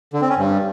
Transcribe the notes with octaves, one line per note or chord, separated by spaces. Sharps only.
D3
C4
C#4
G2